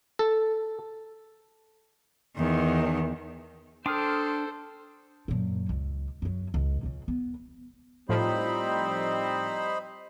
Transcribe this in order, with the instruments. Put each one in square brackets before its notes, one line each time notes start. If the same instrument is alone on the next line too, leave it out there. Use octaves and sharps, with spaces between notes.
[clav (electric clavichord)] A4
[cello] E2 D#3
[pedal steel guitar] D4 G5 D6 [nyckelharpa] A4 C5 [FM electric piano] C6 D#6 F6
[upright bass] F#2 A#2
C#2
F#2 F#3
C#2
C#2 C#3
B3
[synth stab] A2 F3 [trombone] G3 [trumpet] C4 [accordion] D#4 C5 B5